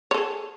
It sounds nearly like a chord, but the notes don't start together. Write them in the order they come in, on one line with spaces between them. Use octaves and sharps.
C#5 A4 G#4